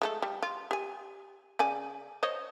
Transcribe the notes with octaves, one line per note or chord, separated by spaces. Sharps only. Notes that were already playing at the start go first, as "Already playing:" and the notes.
G#3 A3 A4
G3
F4
G4 G#5
C#3 D5 G#5
C5 C#5 D#5